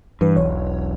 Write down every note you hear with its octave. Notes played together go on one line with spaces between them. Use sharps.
G2 E3 B4
E1 B1 C#5